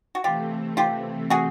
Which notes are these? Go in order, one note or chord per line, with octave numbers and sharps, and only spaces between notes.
F#4
C3 E3 A3 C4 F4 G4
F4 G4
F#4 G#4